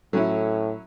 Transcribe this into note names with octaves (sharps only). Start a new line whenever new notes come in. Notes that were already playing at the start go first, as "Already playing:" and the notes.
A2 F#3 C#4 E4 A4